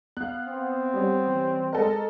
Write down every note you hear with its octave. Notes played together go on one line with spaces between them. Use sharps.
B3 F5 F#6
C4
G3 C#4
E3
G#3 A4 A#4 D#5